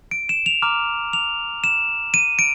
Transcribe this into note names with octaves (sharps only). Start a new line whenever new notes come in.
D7
E7
F7
A#5 D6 F6
F7
E7
D#7
D7